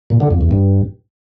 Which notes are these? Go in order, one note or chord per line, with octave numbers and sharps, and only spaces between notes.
A#2
D3
F2
E2
G2